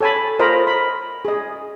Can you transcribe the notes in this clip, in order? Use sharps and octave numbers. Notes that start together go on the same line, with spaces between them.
A4 C#5 G#5 A5 B5
F4 A#4 C5 D#5 A#5 B5
B5
G#4 D#5